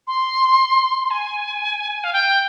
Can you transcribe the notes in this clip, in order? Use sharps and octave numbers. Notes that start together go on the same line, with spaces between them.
C6
G#5
F5
G5